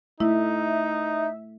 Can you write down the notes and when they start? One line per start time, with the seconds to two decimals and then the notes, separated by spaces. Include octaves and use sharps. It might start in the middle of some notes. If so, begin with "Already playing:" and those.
0.20 A3 D#4 E4 E5